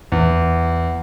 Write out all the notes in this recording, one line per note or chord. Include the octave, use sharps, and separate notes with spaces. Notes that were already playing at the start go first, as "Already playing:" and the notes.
E2